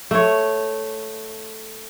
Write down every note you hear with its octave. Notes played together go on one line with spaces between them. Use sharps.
A3 C#5